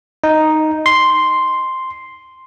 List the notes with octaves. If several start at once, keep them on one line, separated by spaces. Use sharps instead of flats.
D#4
C6